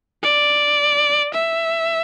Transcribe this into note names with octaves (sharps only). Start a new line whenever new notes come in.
D5
E5